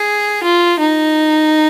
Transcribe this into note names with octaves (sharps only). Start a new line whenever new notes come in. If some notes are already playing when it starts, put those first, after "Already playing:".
Already playing: G#4
F4
D#4